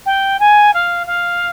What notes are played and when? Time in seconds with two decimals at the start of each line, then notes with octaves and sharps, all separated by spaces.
0.06 G5
0.39 G#5
0.73 F5
1.07 F5